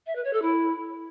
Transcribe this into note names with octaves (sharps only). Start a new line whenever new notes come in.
E5
B4
C#5
A4
E4